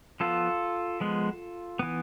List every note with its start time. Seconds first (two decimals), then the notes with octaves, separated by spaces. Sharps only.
0.20 F3 B3 F4 A4
1.01 F3 G#3 B3
1.79 E3 B3